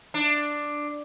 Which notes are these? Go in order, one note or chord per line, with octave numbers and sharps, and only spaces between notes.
D4